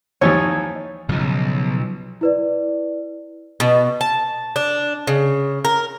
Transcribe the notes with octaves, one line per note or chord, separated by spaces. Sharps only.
D#2 E3 F3 D#4 C#5
B1 G2 C#3 F3
E4 B4 D5
B2
A5
D4
C#3
A#4